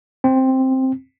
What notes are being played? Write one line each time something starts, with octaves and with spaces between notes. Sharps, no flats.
C4